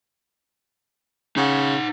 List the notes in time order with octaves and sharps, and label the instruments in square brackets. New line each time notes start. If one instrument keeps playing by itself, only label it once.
[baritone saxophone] C#3 [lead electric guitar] D#4 F#5